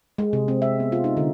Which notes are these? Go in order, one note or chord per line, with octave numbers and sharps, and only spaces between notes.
G#3
C3
C4
E5
B3
F4
D#4
D3